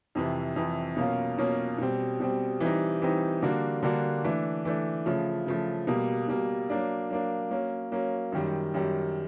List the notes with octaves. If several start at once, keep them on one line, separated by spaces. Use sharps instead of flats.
F2 C3 E3
F2 C3 E3
B2 F#3 A#3 C#4 F4
B2 F#3 A#3 C#4 F4
B2 G3 C4
B2 G3 C4
E3 G3 C4 D#4
E3 G3 C4 D#4
D3 G3 A#3 D4 F#4
D3 G3 A#3 D4 F#4
E3 A3 D4
E3 A3 D4
C#3 F3 A3
C#3 F3 A3
B2 G3 A#3
B2 G3 A#3
F#3 A#3 D4
F#3 A#3 D4
F#3 A#3 C#4
F#3 A#3 C#4
F#2 D#3 G3
F#2 D#3 G3